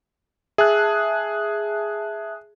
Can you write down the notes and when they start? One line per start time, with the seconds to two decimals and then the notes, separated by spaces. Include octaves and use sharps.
0.58 G#4 E5 A5 F#6